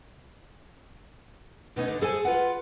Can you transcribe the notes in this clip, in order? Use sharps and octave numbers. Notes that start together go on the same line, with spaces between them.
B2 A3 B3 C#4 D#4
D3
G#4 A4 C5 G#5
F4 B4 F#5